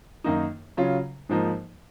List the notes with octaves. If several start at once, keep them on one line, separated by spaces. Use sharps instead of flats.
F#2 D#3 A#3 D#4
C#3 F#3 C#4 F4
G#2 F3 A#3 D#4